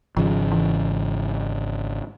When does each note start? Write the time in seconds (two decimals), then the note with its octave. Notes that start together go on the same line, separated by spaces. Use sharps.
0.17 G#1 C#3 F3
0.52 E3